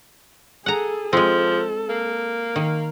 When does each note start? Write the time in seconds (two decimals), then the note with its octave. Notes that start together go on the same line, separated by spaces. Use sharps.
0.66 G#4 A4 F#5 A#5
1.13 F3 G#3 C4 A4
1.89 A#3
2.56 D#3 A#4